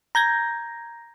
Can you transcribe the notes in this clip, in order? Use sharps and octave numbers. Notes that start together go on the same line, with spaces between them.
A#5 G6 G#6 A#6